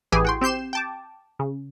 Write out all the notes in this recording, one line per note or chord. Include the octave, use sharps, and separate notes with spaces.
A1 E3 G4 G#4 G#5
F#4 G5 C6
C4 G4 G6 C7 E7
G5 A5 D6
C#3